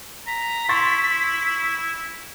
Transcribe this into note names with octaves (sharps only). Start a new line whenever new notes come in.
A#5 B6
E4 C6 C#6 A6